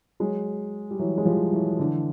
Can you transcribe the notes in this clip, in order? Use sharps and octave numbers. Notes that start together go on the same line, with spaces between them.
F#3 G#3
G3
E3 F#3
G#3
F3 G3
E3 F#3
D3 E3